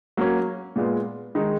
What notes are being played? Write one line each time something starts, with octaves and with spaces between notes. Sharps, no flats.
F#3 A#3 C#4
A#2 G#3 B3 F4
D#3 G#3 D#4